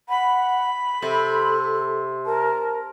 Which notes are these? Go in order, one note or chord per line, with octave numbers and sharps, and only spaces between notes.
F#5 B5
C3 A4
A#4 A5